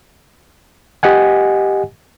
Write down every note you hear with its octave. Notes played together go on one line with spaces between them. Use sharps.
G4 D#5 F#5 G#5